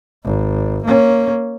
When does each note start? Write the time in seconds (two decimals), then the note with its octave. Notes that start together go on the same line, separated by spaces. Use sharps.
0.24 G#1
0.85 A#3 C#4